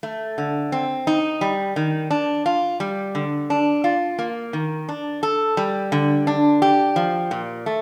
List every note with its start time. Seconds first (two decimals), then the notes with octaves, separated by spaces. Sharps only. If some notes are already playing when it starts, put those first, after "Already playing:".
0.03 A3
0.38 D3
0.72 C4
1.07 D#4
1.41 G3
1.76 D#3
2.11 D4
2.46 F4
2.80 G3
3.15 D3
3.50 D4
3.84 F4
4.19 A#3
4.53 D#3
4.89 D4
5.23 A4
5.57 G3
5.92 D3
6.27 D4
6.62 G4
6.96 F3
7.31 A#2
7.66 A3